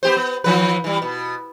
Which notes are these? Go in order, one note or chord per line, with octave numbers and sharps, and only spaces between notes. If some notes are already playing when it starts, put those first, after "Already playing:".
B3 G4 C5
B3
E3 F3 B4
E3 G3
B2